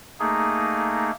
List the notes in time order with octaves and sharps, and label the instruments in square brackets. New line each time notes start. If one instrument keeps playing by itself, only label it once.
[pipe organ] A3 A#3 D#4 G#4